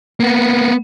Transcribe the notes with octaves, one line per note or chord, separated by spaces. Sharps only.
A#3 B3